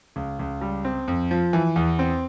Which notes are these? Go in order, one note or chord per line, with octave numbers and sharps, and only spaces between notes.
C#2
C#2
G3
C4
F2
F3
E3
E2
C4